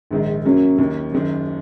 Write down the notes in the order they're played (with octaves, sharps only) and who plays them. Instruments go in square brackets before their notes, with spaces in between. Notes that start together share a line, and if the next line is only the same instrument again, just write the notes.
[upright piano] A#1 G#2 D#3 G#3 D#4
F#2 F#3 A#3 C#4
D#2 D#3 A#3
F#1 F#2 D#3